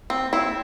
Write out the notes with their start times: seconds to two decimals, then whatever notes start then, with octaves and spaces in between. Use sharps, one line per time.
0.10 C4
0.33 C4 E4